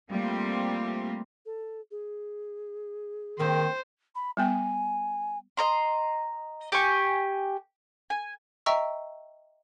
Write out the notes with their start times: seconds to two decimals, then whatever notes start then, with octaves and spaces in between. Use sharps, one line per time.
0.11 G3 A3 A#3 C4 F4 G4
1.46 A4
1.91 G#4
3.39 D#3 A#3 C4 C5
4.15 B5
4.37 G3 B3 G5 G#5
5.57 D#5 A#5 C6
6.72 G4 G#5 C#6
8.10 G#5
8.66 D#5 E5 G5 A#5 C#6 E6